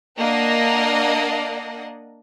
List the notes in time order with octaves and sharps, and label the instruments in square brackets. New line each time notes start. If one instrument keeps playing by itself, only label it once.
[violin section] A#3 D4 A#4 D#5 F#5